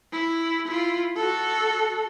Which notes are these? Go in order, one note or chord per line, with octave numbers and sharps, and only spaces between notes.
E4
E4 F4
F#4 A4